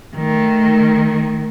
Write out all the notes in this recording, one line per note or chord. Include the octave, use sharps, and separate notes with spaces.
D#3 A3